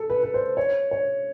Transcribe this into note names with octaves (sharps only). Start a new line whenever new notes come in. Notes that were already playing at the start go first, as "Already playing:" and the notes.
Already playing: A4
B4
B4
C5
C#5
C#5